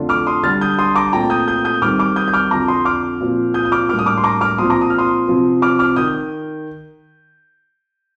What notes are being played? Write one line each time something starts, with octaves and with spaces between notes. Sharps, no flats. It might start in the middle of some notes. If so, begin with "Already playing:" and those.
Already playing: F2 D3 A3 D4 F4
D6 F6
C6 D#6
D3 G3 D4 F6 A6
D#6 G6
C6 D#6
A#5 D6
A#2 A3 C4 F4 G5 A#5
D#6 G6
D#6 G6
D#6 G6
D#3 G3 C4 D#4 D6 F6
D6 F6
D#6 G6
G6
D6 F6
F2 D3 F3 A#5 D6
C6 D#6
D6 F6
A#2 F3 C4 F4
D#6 G6
D#6
D6 F6
A2 G3 A#3 D4 D6 F6
D#6
D6 F6
C6
A#5 D6
D6 F6
A#2 F3 C4 F4 C6 D#6
A#5 D6
D#6
F6
C6 D#6
C3 F3 C4 F4
D6 F6
D6 F6
D#3 D#6 G6